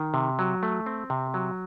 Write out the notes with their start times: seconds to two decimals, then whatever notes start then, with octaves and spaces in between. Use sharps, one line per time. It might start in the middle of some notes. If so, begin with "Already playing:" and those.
Already playing: D#3
0.14 C3
0.39 F#3
0.63 A3
0.86 C4
1.10 C3
1.34 F#3